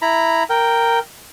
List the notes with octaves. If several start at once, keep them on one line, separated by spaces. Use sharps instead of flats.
E4 A#5 B5
A#4 G5